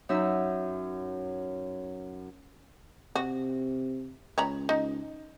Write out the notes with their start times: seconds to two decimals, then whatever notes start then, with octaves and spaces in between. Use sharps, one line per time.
0.09 F#2 D#4 E5 E6
3.15 C3 F#4
4.38 C#2 C#5 A#5 B5
4.69 D#4